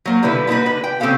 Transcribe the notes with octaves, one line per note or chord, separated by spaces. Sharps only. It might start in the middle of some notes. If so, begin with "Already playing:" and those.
F#3 A#3 C5
B2 D3 G3 E4 B4
A#3 B3 D#4 F#4 B4
D3 B4
G5
C#3 C4 G4 A4 F5 G5